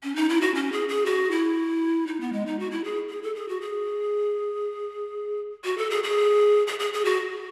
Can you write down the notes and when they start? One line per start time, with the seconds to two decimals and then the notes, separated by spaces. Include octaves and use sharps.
0.03 C#4
0.16 D#4
0.29 E4
0.41 F#4
0.55 C#4
0.72 G#4
0.89 G#4
1.06 F#4
1.31 E4
2.07 D#4
2.21 B3
2.33 G#3
2.46 D#4
2.59 F#4
2.71 E4
2.84 G#4
3.10 G#4
3.23 A4
3.35 G#4
3.49 F#4
3.61 G#4
5.65 F#4
5.78 A4
5.90 G#4
6.04 G#4
6.67 G#4
6.80 G#4
6.93 G#4
7.05 F#4